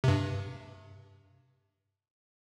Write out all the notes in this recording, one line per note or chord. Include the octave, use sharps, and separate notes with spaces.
G2 C3